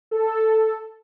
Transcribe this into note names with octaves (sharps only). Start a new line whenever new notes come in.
A4